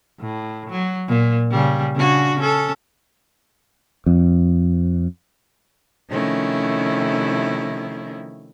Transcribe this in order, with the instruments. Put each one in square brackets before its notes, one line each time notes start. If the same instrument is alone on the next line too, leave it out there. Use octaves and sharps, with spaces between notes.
[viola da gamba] A2
F#3
A#2
C#3 G3
C#3 D4 F#4
C#4 A4
[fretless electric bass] F2
[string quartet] C3 D#3 F3 A3 C#4 E4